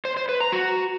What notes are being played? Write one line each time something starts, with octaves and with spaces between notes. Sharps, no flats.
C5
C5
B4
A#5
F#4